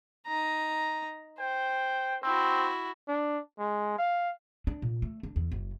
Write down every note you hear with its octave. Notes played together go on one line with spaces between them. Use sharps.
D#4 A#5
C5 G5
C4 E4 F#4
D4
G#3
F5
D4
A#2
A3
D4
E2
F#1